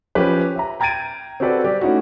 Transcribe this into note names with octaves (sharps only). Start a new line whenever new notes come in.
F3 C#4 G4 B4
E5 A#5
G5 A#5 G#6 A6 D7 D#7
C4 F#4 G4 A4 B4 D5
G3 G4 D5
A3 C#4 D#4 E4 F#4